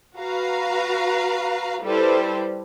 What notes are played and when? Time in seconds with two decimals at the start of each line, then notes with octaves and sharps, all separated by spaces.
0.16 F#4 B4 F5 A#5
1.81 G3 E4 A4 B4 C5